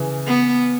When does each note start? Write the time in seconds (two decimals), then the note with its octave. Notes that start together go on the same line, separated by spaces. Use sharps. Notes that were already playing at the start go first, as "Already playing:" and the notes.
Already playing: C#3 E3
0.27 B3